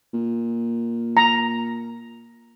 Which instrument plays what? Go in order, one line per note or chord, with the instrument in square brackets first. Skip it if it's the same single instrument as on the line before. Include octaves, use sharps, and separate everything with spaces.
[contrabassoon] A#2
[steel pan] A#5